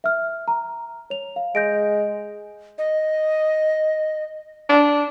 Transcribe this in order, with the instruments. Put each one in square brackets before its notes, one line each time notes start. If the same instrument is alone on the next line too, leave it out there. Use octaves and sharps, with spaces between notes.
[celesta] E5 F6
A#5
C#5 F7
F5
[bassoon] G#3 [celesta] G6 A#6 D7
[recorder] D#5
[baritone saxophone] D4